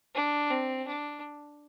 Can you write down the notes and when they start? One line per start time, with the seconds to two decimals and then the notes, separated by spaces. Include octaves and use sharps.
0.15 D4
0.51 C4
0.87 D4